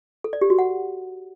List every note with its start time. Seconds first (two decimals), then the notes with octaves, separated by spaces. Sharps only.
0.24 A4
0.33 D5
0.41 G4
0.50 F#4
0.59 F#5